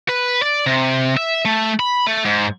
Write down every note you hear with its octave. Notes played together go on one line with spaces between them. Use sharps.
B4
D5
C3
E5
A3
B5
A3
G#2